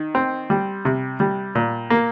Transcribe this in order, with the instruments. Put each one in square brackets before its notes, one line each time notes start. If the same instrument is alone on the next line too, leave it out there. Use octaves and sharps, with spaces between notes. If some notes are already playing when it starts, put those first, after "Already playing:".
Already playing: [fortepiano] D#3
C4
G3
C3
G3
A#2
A#3